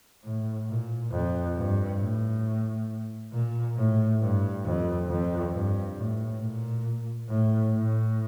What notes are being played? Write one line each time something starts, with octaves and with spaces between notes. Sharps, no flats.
A2
A#2
F2
G2
A2
A#2
A2
G2
F2
F2
G2
A2
A#2
A2
A2